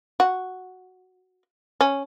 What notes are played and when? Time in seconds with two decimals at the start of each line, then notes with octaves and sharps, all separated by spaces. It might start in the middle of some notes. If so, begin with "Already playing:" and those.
0.20 F#4
1.81 C#4